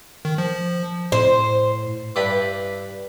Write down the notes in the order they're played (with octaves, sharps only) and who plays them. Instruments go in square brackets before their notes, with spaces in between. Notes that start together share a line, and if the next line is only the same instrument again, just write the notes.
[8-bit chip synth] D#3
F3
[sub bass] A2 [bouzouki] C5
[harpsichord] G2 D4 E4 B4 G5 B5